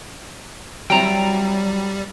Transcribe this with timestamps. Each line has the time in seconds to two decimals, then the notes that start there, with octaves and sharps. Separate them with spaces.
0.90 F#3 G3 C4 E4 G5 A#5